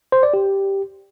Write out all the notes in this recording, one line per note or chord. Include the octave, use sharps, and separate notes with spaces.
C5
D5
G4